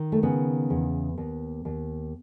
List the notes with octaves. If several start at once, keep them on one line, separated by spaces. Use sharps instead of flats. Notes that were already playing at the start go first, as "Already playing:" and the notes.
Already playing: D#3
A3
C#3 B3
E2
D#2
D#2